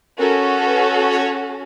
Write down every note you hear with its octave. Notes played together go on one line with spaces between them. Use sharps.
C#4 F#4 A4 A#4
B4
C#5